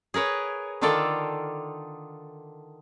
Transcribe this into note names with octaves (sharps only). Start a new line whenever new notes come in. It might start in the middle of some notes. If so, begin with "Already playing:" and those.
G#4 A#4 B4 C#5
D3 D#3 D4 F4 A4 D5